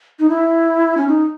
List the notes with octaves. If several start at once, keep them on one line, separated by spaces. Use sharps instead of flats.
D#4
E4
C#4
D#4